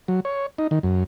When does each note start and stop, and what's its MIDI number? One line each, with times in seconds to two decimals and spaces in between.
0.08 0.20 54
0.25 0.46 73
0.58 0.67 63
0.71 0.79 51
0.83 1.04 42